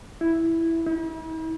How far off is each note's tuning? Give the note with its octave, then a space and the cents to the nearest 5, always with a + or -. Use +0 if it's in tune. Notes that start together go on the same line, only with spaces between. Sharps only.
E4 +0
E4 -45